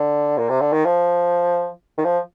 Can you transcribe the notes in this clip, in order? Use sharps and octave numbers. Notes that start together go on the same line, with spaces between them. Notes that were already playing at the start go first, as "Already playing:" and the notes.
Already playing: D3
A#2
C3
D3
D#3
F3
D#3
F3